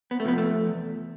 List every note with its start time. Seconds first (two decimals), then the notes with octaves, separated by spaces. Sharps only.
0.11 B3
0.20 A3
0.24 C3 F3 B3
0.38 A3
0.65 E2